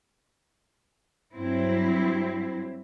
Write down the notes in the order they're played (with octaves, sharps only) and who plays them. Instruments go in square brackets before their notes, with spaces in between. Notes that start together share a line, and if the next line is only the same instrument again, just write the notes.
[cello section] G2 F#3 C4 E4